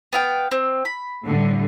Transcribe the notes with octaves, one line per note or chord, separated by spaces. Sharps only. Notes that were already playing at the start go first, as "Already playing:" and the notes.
B3 F5 G5
C4
B5
A2 D3 G3